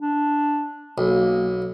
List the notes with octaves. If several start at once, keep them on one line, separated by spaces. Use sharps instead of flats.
D4
B1 A#3